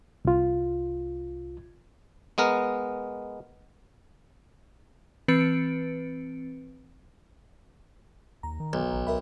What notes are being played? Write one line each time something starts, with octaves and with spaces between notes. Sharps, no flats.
C2 F4
G#3 B3 A#4
E3 C4 B4 A6 C#7 D7
D#2 A#5
D#3
B1
A1
C#2 A#4 E5 B5